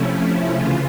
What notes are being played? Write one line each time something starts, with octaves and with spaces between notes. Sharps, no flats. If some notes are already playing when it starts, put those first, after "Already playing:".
Already playing: C3 F3 A3 C#4 E4
E4
C#3 E3 F4